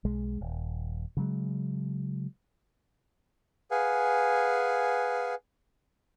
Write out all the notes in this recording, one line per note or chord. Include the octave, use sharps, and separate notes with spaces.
B1 G#3
D#1
C#3 F#3 G#3
G#4 B4 F5 F#5 G#5